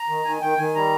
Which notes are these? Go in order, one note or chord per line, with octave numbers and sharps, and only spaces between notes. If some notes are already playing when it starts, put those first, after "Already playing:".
Already playing: A#5
D#3
D#3 G#5
D#3 G5
D#3 G#5
G3 A#5